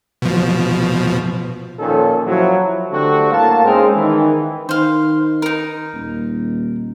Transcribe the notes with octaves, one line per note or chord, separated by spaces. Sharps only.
B2 F3
A#2 D#3 F3 C#4 D#4 A4
F3 F#3 E4
D3 G3 A3 C4 F#4
A2 A#3 F5 A5
G#3 C4 C#4 D#4 A#4 C5
D#3 E3
D#3 C5 F5
D#4 A#4
D#1